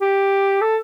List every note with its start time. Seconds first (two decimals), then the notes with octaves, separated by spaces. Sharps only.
0.01 G4
0.61 A4